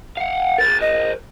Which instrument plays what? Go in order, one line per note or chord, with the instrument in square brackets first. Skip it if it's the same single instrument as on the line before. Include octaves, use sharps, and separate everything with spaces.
[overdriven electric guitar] F5 F#5
[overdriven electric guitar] A#4 C5 [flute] A6
[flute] D#5